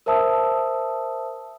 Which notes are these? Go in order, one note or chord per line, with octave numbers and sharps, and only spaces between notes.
A#4 C5 E5 A5 D#6 E6